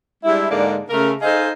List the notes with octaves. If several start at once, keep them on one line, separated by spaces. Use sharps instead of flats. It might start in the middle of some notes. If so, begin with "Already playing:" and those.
G3 G#3 D4 E4
G#2 D3 G#3 A#3 D5
C#3 A3 A#4
D#4 G#4 A4 C5 D#5 F5